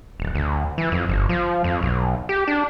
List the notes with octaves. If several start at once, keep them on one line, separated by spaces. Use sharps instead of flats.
D1
D2
E3
F2
G1
F3
F2
B1
G4
D4